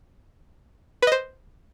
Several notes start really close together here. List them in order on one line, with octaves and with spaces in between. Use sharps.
B4 D#5 C5